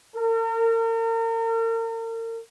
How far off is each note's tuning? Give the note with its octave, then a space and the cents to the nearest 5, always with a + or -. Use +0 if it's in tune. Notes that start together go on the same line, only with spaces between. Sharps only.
A#4 -40